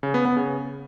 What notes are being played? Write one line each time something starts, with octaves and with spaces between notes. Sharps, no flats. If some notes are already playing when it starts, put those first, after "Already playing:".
C#3
B3
B3
C#3